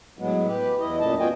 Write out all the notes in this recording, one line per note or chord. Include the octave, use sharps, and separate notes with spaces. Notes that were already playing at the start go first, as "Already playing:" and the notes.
A2 F#3 G#3 B3
G4 B4
E2 E4 D#5
F#2 A#2 A3 D#5 A5
B3 F4 F#4 D#5 G5 G#5